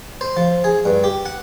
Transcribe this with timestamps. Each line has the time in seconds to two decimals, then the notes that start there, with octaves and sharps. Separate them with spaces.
0.21 C5
0.37 F3
0.64 G#4
0.85 G2
1.04 G4
1.26 F#5